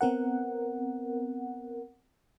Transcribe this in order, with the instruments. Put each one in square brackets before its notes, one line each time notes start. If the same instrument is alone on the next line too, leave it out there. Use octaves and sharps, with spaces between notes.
[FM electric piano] B3 C4 A#4 F#5